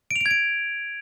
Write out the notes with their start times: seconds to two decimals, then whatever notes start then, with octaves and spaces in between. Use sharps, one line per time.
0.11 D7
0.16 F7
0.21 D7
0.26 G#6
0.31 D7